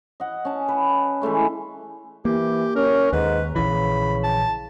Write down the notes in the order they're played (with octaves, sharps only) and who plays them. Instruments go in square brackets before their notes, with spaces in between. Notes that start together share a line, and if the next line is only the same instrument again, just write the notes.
[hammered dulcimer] D#5 F#5
C#4 A5
B4
E3 G#3 A3 C#4
[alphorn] E3 [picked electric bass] A#3 [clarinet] G4
[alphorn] C#4 [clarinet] A#4
[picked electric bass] D#2 [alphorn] G#2 [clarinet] B4
[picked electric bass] A#1 E3 [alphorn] C#3 [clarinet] B5
[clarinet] A5